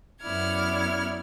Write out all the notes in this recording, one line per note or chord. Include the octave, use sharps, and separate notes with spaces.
F#2 B3 E4 D5 F6 G#6